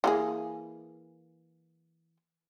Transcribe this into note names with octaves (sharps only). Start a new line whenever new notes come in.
E3 A#3 G#4